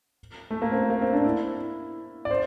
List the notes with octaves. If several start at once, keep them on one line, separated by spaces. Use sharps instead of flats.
A3
A#3
C4
A#3
C4
D4
E4
D5
C5